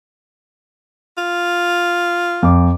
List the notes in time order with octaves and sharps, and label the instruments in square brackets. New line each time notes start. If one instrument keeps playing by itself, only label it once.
[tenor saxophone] F4
[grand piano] F2 D6